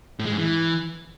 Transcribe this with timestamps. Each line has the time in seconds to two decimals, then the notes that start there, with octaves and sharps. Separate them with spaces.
0.19 A2
0.26 G#3
0.32 G#2
0.38 E3